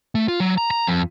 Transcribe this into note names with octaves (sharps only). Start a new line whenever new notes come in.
A3
F4
F#3
A#5
A#5
F2